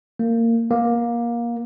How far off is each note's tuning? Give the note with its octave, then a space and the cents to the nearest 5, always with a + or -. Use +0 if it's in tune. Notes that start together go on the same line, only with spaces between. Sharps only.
A#3 -20
A#3 +20